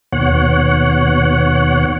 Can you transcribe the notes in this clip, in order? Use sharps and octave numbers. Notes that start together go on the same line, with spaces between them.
D#2 B2 C#5 F#5